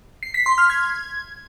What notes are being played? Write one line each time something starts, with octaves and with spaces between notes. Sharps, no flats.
C7
B6
C6
F6
G#6